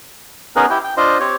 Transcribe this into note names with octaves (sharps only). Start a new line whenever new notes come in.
B3 C#4 D#4 G#4 A#4 B4
E4 G4 G5
G5
D4 F4 C5 D#5
C4 G4 C#5